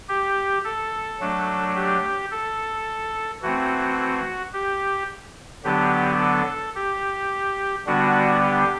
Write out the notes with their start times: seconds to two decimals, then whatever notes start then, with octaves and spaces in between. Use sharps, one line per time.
0.08 G4
0.65 A4
1.20 F#3 A3 D4
1.75 G4
2.31 A4
3.42 E3 A3 C4 F#4
4.53 G4
5.64 D3 F#3 B3 D4 G4
6.20 A4
6.75 G4
7.87 D3 G3 B3 D4 F#4
8.43 G4